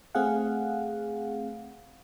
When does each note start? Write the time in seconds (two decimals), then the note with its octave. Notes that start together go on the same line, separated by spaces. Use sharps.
0.15 A3 C4 G#4 F5 F#5